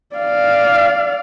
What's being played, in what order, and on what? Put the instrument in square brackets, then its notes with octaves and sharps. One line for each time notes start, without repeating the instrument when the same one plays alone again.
[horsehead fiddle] D5 F5